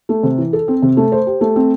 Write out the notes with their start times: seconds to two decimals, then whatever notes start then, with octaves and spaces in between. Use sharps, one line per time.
0.09 A3
0.23 C3
0.38 E3
0.53 A4
0.68 C4
0.82 C3
0.97 A3
1.12 C5
1.27 G4
1.41 A3
1.56 C4